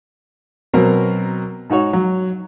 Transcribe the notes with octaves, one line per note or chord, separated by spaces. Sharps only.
B2 F#3 C4 A#4
G#2 D#4 F#4 C#5
F#3